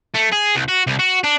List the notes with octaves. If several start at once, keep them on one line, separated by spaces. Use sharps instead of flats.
A3
G#4
C2
F#4
C2
F#4
D4